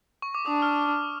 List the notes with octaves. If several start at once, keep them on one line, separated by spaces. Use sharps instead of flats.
C#6
D6
D4 D#6
F6